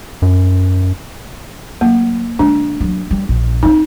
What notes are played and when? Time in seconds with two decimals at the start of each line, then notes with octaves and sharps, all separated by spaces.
0.22 F#2
1.81 F#3 A3 A#3
2.39 D3 G#3 D4
2.81 F#3 G#3
3.11 G3
3.29 A#1
3.63 C4 C#4 D#4